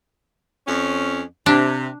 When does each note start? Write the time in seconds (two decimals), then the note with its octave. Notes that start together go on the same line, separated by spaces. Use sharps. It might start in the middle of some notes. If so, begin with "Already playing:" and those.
0.67 F2 C#4
1.46 C3 D4